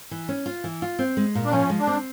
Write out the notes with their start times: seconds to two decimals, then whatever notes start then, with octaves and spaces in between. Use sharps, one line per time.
0.11 E3
0.29 C#4
0.46 F4
0.64 E3
0.82 F4
0.99 C4
1.17 G#3
1.35 A#2
1.45 D4
1.52 F3 C#4
1.70 G#3
1.79 D4
1.87 C4